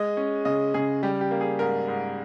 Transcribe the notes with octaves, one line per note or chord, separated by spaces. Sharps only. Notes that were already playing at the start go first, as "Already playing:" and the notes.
Already playing: G#3 D#5
C#4
C#3 D#5
C#3 G#4
G3 G4
G4
A#3
G#4
G#2 A#4
G#2